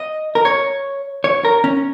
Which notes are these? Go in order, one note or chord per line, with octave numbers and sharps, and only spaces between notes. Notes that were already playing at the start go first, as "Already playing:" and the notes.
Already playing: D#5
A#4
C#5
C#5
A#4
C#4